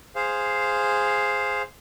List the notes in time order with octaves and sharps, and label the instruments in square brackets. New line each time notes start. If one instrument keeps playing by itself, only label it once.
[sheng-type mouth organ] G#4 C5 F5